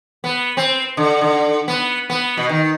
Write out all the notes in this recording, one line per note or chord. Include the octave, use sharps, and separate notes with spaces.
B3
C4
D3
D3
B3
B3
B2
D#3